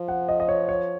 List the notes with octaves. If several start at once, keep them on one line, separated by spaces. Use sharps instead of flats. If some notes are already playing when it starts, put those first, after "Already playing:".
Already playing: F3
F#5
D#5
D#5
C#5
C#5